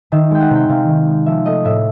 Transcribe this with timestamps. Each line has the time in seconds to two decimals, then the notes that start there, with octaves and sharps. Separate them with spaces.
0.12 D#3 E5
0.31 G#3 G5
0.40 F#5
0.50 C3 G5
0.69 C3 F5
0.88 D#3
1.07 G#3
1.26 F3 E5
1.46 A3 D#5
1.64 A2 E5